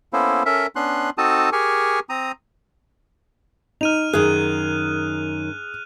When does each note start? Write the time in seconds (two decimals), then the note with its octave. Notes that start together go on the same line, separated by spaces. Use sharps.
0.13 A#3 B3 C#4 E4 A4 C5
0.46 C#4 A4 A#4 E5
0.76 B3 C#4 D4 C6 F#6
1.18 C4 D#4 F#4 A4 A5 D#6
1.52 G4 G#4 A#4 G#5 C#6
2.09 C4 A#5 D#6
3.81 D#4 F6 D#7 F7
4.13 F#2 D#3 G#4 F#6 F7